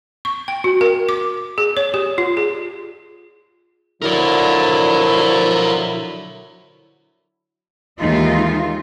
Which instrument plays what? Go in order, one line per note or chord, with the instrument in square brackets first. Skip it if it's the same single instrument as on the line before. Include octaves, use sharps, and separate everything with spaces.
[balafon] C#6
G5
F#4
A#4
D6
G#4
C#5
G4
F4
G#4
[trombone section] D3 F#3 E4 [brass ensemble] F3 [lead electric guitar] A#4 D5
[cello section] D#2 E3 G#3 D#4 F4 E5